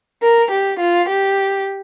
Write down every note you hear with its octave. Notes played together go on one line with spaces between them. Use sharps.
A#4
G4
F4
G4